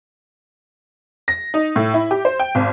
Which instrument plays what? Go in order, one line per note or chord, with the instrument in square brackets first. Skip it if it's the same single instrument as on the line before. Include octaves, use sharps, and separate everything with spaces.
[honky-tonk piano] A#6
D#4
A2
E4
G4
C5
G5
G#1